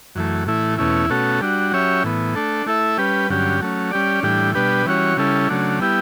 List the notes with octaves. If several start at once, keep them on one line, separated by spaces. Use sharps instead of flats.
F#2 E3 A3
A2 E3 A3 E4
E2 B2 A3 C#4 E4
B2 A3 C#4 F#4 A4
G3 D4 F#4
F#3 C#4 G4 C#5 E5
A2 E3 B3
A3 D4 A4
A3 E4 A4 E5
G3 C#4 G4 B4
G2 D3 F#3 C#4 G4
F#3 A3 C#4
G3 C#4 G4 D5
A2 E3 G3 D4 G4
B2 G3 D4 G4 B4
E3 G3 C#4 F#4 C#5
C#3 G3 C#4 E4 A4
C#3 F#3 A3 D4
G3 B3 E4 G4